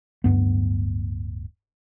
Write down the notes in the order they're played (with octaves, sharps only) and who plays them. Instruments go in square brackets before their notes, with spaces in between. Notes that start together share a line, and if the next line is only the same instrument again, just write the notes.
[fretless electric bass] D1 G1 G2 B3